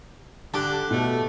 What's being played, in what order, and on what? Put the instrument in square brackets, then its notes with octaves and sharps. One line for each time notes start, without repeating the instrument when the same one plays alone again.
[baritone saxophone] D3 [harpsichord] G4 [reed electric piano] A5 D6 F#6
[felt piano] B2 [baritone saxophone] A3